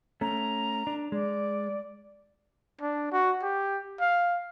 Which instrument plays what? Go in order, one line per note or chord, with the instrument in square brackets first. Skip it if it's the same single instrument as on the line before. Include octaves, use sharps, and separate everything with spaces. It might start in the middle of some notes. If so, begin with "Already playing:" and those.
[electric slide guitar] A3 C#4 [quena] A#5
[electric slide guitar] D4
[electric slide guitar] G#3 [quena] D5
[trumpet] D4
F#4
G4
F5